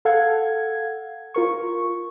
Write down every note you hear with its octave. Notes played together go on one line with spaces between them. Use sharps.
A4 F5 F#5 G#6
F4 A#4 C#6